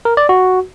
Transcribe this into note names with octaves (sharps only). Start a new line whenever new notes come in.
A#4
D5
F#4